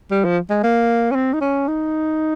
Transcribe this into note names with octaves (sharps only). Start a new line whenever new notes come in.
G3
F3
G#3
A#3
C#4
C4
D#4
C#4
D#4